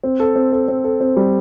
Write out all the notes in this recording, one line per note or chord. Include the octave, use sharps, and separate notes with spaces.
C4
A4
C4
A4
C4
A4
C4
G3